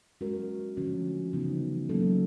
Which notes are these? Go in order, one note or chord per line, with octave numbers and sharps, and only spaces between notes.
G#3 C#4 F#4 A#4
D3 F3 A3 C#4 F#4
C#3 E3 G3 B3 D#4
F#3 A#3 C#4 E4 A4